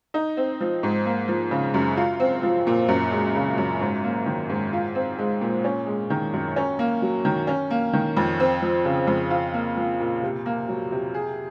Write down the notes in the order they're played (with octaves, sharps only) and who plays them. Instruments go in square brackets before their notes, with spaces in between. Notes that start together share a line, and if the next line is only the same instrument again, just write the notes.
[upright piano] D#4
C4
F3
G#2
A#3
F3
C#3
F#2
F4
C4
F3
A#2
F#2
G#3
C#3
F#2
G#2
A#3
D#3
G#2
F4
C4
G#3
A#2
C#4
G#3
D#3
F#2
C#4
A#3
F#3
D#3
C#4
A#3
D#3
F2
C4
F3
C#3
F2
F4
A#3
F3
A#2
C3
A#3
F#3
C3
G#4